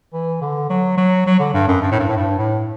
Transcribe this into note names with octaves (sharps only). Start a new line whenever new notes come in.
E3
D3
F#3
F#3
F#3
D3
G2
F#2
G2
A2
G2
A2
G2
A2